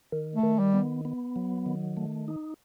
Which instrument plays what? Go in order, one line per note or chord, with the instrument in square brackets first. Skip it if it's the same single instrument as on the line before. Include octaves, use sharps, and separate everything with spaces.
[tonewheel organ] D#3
[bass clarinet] A3
[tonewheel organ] D#3
[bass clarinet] G3
[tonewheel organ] B3
B3
F#3
D#3
A3
D#4